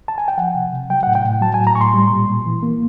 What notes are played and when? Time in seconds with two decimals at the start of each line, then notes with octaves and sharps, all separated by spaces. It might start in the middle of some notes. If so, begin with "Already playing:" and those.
0.08 A5
0.18 G#5
0.28 G5
0.37 F3 F#5
0.55 C3
0.73 C3
0.90 F#3 G5
1.03 A2 F#5
1.15 G5
1.25 A2
1.41 F#3 A5
1.54 G#5
1.59 A2
1.67 A#5
1.75 A2 C#6
1.81 C6
1.94 G3
2.10 A#2
2.28 A#2
2.46 E3
2.63 A#3